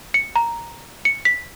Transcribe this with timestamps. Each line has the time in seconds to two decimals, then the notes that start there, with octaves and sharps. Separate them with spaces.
0.14 C#7
0.36 A#5
1.05 C#7
1.25 B6